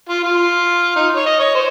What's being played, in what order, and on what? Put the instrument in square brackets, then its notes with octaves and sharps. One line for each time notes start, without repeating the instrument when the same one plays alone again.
[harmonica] F4
F4
D#4
C#5
D#5
C#5
C5